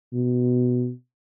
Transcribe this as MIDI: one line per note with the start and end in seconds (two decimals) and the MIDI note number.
0.13 0.90 47